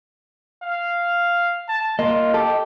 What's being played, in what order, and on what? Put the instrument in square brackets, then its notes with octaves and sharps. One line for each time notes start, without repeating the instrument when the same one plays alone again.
[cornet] F5
A5
[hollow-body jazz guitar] A#3 [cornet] F4 [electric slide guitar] D#5
[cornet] G4 [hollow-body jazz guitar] A4